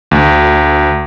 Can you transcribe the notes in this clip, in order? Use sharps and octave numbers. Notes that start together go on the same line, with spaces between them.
D2